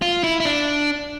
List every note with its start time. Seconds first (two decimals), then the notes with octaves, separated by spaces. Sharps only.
0.02 F4
0.24 E4
0.40 E4
0.45 D4